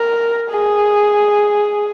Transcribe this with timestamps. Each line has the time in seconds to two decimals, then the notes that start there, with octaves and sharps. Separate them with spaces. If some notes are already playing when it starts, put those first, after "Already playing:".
Already playing: A#4
0.50 G#4